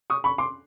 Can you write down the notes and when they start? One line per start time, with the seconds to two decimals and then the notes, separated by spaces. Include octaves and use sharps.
0.10 C#6 D#6
0.24 B5 C#6
0.38 C6 D6